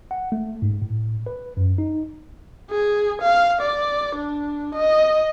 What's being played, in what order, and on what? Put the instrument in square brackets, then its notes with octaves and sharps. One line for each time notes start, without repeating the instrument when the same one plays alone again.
[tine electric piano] F#5
A3
G#2
A2
B4
F#2
D#4
[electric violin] G#4
F5
D5
D4
D#5